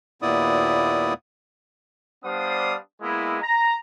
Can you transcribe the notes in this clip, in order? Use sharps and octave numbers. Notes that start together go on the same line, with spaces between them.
D#2 A#2 B3 E4 D5 D#6
G3 B3 D4 C5 F5 D#6
G#3 A#3 B3 E4
A#5